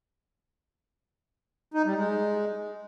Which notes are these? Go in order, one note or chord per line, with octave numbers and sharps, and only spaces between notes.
D#4
G3
G#3